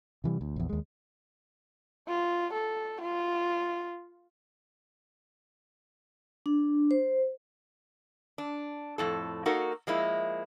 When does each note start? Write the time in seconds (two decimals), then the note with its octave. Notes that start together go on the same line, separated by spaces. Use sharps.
0.24 C3 E3 G3
0.41 D2
0.56 A#1 E2
0.69 D#2 G#3
2.08 F4
2.53 A4
3.01 F4
6.46 D4
6.91 C5
8.38 D4
8.98 F2 A2 A4
9.46 A#3 D#4 F#4 A4 A#4
9.87 F3 G#3 A#3 E4